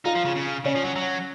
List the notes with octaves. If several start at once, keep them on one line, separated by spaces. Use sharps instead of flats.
D#4 F4
F3
C#3
C#3
C#3 C#4
F3
F#3
F#3